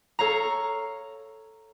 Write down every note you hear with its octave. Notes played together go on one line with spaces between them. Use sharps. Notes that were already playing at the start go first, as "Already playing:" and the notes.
A4 C#5 F5 A#5